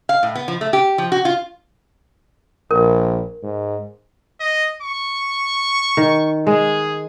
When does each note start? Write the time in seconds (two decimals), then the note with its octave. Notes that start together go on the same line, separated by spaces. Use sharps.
0.09 F5
0.23 A2
0.35 B3
0.48 F3
0.61 A3
0.73 G4
0.98 F3
1.12 F#4
1.25 F4
2.71 A#1 A#4
3.43 G#2
4.40 D#5
4.82 C#6
5.97 D#3
6.47 G#3 G#4